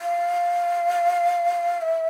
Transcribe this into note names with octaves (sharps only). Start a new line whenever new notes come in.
F5
E5